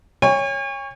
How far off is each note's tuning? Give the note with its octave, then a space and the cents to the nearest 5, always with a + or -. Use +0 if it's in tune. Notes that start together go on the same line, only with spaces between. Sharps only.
C#5 +0 G#5 -45